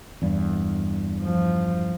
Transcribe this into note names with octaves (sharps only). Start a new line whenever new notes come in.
E2 G2
F3